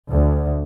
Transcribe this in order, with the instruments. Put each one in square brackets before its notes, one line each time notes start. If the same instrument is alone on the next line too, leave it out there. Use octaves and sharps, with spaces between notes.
[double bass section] D2